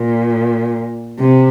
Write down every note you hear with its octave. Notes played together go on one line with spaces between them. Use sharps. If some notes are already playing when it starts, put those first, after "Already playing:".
Already playing: A#2
C3